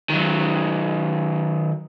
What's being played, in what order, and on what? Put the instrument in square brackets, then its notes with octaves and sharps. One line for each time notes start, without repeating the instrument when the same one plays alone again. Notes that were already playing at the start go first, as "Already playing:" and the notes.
[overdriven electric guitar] D#3 F#3